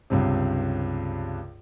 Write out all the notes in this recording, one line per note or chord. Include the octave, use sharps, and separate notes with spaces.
C#2 G2 C3